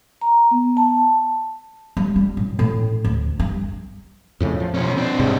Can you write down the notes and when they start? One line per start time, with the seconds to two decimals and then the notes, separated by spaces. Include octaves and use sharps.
0.21 A#5
0.51 B3
0.77 A5
1.97 G3
2.16 G3
2.37 A1
2.59 A2
3.05 D2
3.40 G2
4.40 F2 A2 C#3
4.60 F3
4.74 B1 C#4
4.97 C4 D4
5.19 G#2 C3